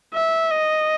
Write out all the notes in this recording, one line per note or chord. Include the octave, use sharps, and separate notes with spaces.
E5
D#5